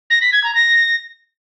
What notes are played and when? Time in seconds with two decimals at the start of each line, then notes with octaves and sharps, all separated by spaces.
0.10 A#6
0.21 B6
0.33 G#6
0.44 A#5
0.55 A#6